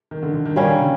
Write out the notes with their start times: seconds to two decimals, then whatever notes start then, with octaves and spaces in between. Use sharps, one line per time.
0.11 D#3
0.23 D3
0.34 D3
0.46 D#3
0.56 D#3 G3 A#3 C#4
0.67 D3
0.79 C#3